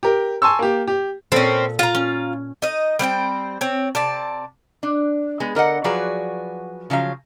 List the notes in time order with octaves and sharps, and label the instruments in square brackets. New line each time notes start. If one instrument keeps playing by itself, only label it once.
[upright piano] G4 A#4
G#5 A5 C6 C#6 E6
A#3 G4
G4
[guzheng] A#2 A4 B5 [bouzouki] C4 C#4
[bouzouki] F4 A#5
[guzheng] C#4
[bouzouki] D#4 D#5
G3 C4 F#5 G5
C4 C#5
C3 D5 A5
[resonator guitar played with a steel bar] D4
G#3 B3 G#4
D3 A#4 D#5 F#5
F3 F#3 F#4 G#4 B4 D5
C#3 F3 F#3 F5